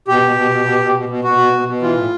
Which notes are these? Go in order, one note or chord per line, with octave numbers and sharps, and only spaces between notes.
B2 G4
B2
B2
B2
B2
B2
B2
B2
B2 F#4
B2
B2
B2
E3 F4
A2